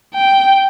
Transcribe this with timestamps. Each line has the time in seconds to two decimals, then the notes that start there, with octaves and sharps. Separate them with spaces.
0.14 G5